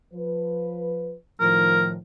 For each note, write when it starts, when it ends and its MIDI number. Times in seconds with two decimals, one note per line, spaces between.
0.14 1.14 53
0.14 1.14 71
1.40 1.96 45
1.40 1.96 51
1.40 1.96 53
1.40 1.88 70